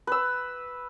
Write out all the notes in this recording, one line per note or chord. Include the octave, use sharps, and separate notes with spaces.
B4 E6